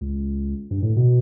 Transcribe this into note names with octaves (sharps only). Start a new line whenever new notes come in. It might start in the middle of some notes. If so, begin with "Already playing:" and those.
C#2
G2
A2
B2